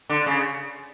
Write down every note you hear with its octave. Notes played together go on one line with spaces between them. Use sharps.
D3
C#3